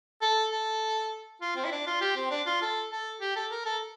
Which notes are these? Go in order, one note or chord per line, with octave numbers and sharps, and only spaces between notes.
A4
A4
F4
C4
E4
D4
F4
G4
C4
D4
F4
A4
A4
G4
A4
A#4
A4